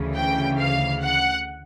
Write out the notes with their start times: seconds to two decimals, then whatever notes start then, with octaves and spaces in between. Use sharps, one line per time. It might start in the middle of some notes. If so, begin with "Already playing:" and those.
Already playing: D2 C#3 E3
0.14 G5
0.58 F5
1.03 F#5